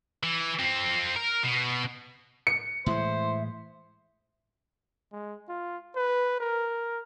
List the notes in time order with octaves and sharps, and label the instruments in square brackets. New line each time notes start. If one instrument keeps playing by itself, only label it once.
[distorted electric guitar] E3
F2 C4
A#4
B2
[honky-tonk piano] C#7
[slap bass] A2 E3 G#3 [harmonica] C5 [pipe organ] E5
[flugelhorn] G#3
F4
B4
A#4